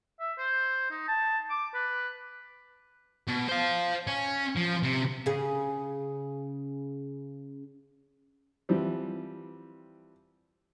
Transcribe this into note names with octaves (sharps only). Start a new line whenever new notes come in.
E5
C5
D#4
A5
D6
B4
B2
C5 F5
C#4
F3
C3
C#3 G#4
E3 F3 G3 C4